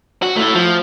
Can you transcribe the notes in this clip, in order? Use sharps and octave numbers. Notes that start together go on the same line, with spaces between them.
F#4
A3 E4
F3